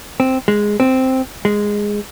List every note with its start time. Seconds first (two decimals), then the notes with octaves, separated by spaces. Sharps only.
0.20 C4
0.48 G#3
0.80 C4
1.45 G#3